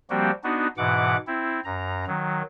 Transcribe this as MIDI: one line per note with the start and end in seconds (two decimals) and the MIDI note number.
0.10 0.31 53
0.10 0.31 55
0.10 0.31 58
0.10 0.31 60
0.10 0.31 66
0.10 0.31 67
0.44 0.67 59
0.44 0.67 62
0.44 0.67 63
0.44 0.67 66
0.77 1.16 44
0.77 1.16 47
0.77 1.16 52
0.77 1.16 78
0.77 1.16 86
1.27 1.60 60
1.27 1.60 64
1.65 2.05 42
1.65 2.05 82
2.07 2.42 51
2.07 2.42 54